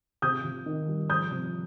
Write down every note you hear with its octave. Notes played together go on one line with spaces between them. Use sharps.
C3 D#6 G6
C3
D#3
G3
F3 D#6 G6
C3